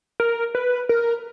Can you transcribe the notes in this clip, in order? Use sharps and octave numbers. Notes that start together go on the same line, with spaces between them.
A#4
B4
A#4